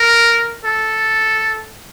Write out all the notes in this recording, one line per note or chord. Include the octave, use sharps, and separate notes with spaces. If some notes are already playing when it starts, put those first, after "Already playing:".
Already playing: A#4
A4